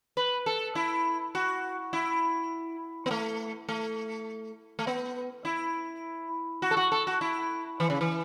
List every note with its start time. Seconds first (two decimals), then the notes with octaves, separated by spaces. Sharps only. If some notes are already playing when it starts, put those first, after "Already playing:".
0.17 B4
0.46 A4
0.75 E4
1.35 F#4
1.93 E4
3.06 B3
3.11 A3
3.69 A3
4.79 A3
4.87 B3
5.45 E4
6.62 F#4
6.71 A4
6.77 F#4
6.92 A4
7.07 F#4
7.21 E4
7.80 E3
7.90 C#3
8.01 E3